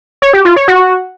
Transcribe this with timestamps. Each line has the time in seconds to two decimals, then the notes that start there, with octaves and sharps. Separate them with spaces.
0.22 C#5
0.33 G4
0.45 F4
0.56 C#5
0.68 F#4